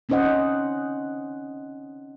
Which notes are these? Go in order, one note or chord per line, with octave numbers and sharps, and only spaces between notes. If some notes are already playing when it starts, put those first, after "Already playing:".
C4 C#4 D#4 C5 D#5 F#5